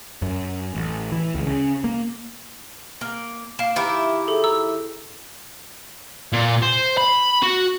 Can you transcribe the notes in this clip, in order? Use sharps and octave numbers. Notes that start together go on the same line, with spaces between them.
F#2
A1
E3
C#2
C#3
A#3
A#3
A#3 F5 E7
D#3 E4 G4
G#4 A4
A#5 E6
A#2
C5
B5
F#4